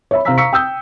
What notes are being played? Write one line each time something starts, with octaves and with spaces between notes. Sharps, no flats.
C#5 E5 B5
C3 C5 F5 A#5 E6 B6
F5 A#5 C#6 E6 B6 C#7
G5 D#6 E6 G6